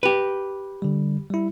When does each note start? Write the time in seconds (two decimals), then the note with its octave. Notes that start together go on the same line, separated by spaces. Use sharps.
0.03 G4 B4
0.82 D3 G3
1.30 G3 E4